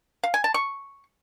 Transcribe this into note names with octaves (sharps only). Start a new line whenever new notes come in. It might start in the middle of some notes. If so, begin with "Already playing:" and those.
F5
G#5
A5
C#6